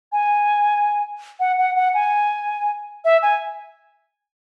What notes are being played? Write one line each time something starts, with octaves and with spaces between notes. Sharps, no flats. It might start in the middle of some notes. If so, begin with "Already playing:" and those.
G#5
F#5
F#5
F#5
G#5
E5
G#5